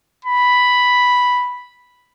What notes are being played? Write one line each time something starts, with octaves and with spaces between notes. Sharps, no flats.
B5